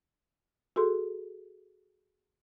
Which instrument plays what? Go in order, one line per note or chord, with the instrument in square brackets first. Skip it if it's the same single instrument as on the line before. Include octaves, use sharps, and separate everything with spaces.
[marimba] F#4 G#4 A4 C6